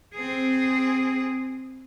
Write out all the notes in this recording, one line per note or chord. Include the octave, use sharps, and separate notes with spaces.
C4 G#4